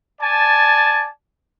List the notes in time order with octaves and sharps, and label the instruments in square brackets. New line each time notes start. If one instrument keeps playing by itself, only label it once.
[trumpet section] D5 G#5 A5